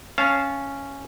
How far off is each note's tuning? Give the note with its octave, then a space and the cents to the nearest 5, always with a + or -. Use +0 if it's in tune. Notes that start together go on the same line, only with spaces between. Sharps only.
C#4 +0 F5 -10 A5 -20